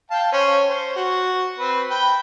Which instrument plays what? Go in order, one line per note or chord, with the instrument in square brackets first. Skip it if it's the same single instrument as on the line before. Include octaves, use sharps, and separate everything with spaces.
[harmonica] F5 G5 A5
C#4 C5 C#5
C5
F#4
C4 B4
G5 B5